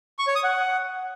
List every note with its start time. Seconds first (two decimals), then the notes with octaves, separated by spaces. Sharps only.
0.19 C#6
0.27 C#5
0.35 D#6
0.44 F#5